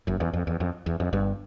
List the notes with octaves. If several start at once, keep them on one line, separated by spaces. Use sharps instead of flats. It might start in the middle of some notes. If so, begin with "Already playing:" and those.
F#1 F#2
E2
F2
E2
F2
E2
F2
G1 G2